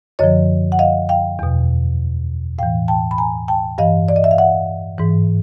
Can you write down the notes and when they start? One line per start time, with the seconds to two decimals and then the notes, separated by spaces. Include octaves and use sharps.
0.19 F#2 D3 F3 C#5 D#5
0.72 F#5
0.79 D#5 F5
1.09 F5 G5
1.39 E2 B2
2.58 A2 E3 F5 G5
2.88 G5 A5
3.11 B5
3.18 G#5 A#5
3.48 G5 A5
3.78 G2 E3 D#5 F5
4.09 D5
4.16 D#5
4.24 E5
4.31 F5
4.38 E5 F#5
4.98 G#2 E3